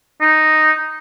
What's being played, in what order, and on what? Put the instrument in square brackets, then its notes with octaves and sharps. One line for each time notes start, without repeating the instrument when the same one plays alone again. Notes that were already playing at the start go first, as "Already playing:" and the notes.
[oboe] D#4